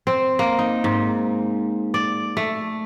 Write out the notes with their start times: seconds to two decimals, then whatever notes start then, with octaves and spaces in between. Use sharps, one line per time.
0.07 C4
0.39 A#3
0.59 D#4
0.84 G#2
1.94 D5
2.37 A3